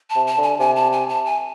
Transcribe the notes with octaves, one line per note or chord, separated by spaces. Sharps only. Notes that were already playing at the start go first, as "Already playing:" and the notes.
A5
C3
A5
D3
G#5
C3 G#5
A5
G#5
A5
G#5